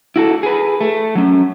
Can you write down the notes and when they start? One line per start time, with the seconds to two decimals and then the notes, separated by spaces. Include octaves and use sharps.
0.16 E4 F#4 A4
0.43 G#4 B4
0.81 A3
1.15 F#3 C#4